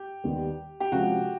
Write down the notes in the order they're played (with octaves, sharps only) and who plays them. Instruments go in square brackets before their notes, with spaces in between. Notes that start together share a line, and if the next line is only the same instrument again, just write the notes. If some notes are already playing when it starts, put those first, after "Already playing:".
Already playing: [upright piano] G4
[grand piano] D#2 D#3 G3 B3
[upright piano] G4
[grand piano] C3 F3 G#3 C#4 [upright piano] F#4